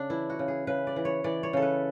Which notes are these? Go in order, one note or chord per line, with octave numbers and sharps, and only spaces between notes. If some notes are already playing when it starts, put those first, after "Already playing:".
Already playing: C#3 D4
E3 E4
F#4
C#3
G#4
C#3 B4
D5
E3
C#5
E3 D5
C#5
C#3 A4
B4